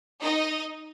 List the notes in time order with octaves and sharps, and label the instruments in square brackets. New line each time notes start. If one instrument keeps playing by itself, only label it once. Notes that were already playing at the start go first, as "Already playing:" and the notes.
[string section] D#4 D#5